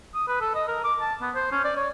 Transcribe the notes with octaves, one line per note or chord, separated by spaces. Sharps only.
D#6
B4
A4
D#5
A#4
D6
A5
B3
C5
C#4
D5
C#5